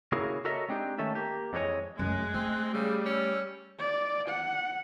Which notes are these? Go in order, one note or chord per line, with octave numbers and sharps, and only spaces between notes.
C#3 A#3 E4 F#4 G#4 A#4
F#4 A4 A#4 C#5 D#5 E5
G#3 C4 D4 D#4 G4
D#3 A3 C#4 A4 E5
A#3 G4
F2 E3 G#3 C#4 C#5 D#5
F#2 G#3 A3 F#6
A3 C4
C#3 G3 E6
C#4
D5
F#5